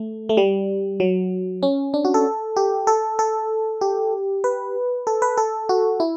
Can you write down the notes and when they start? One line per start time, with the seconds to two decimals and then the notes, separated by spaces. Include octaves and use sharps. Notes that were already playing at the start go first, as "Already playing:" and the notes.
Already playing: A3
0.29 A3
0.37 G3
1.00 F#3
1.63 C#4
1.94 D4
2.05 F#4
2.14 A4
2.56 G4
2.87 A4
3.19 A4
3.81 G4
4.44 B4
5.07 A4
5.22 B4
5.37 A4
5.69 F#4
6.00 E4